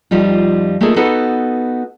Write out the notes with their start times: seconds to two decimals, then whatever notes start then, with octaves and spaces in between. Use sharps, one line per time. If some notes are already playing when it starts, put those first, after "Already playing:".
0.11 F2 F3 G3 D#4 F4
0.81 A3 A#3 D#4 F4 G#4 A4
0.96 B3 D#4 F#4 A4 B4